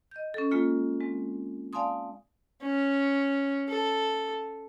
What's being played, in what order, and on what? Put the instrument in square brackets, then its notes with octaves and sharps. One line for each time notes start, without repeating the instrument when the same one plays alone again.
[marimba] D#5 G6
C#4 A4
G#3 A#3 F4
G#3 C4
D5 F5 G#5 A5 C6 D#6
[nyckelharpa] C#4
A4